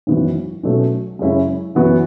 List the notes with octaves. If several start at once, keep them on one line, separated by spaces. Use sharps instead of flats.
G#1 F#2 E3 B3 F#4
B1 B2 F#3 A3 C#4
F#2 C#3 G#3 C#4 E4
F#2 E3 B3 F#4